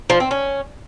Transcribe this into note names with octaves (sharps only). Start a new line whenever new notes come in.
F3
C4
C#4